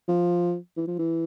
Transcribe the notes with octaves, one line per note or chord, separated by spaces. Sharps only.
F3
E3
F3
E3